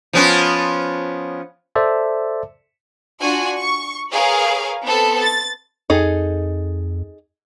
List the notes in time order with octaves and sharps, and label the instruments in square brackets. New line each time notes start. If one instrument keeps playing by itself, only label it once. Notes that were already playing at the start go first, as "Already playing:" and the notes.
[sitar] F3 B3 C#4
[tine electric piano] A4 C5 D5 E5 A5
[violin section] D4 F4 F#4 G#5
C#6
G#4 A#4 B4 C#5 F5
B3 C4 A4
A6
[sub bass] F2 [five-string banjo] D#4 G#4 A4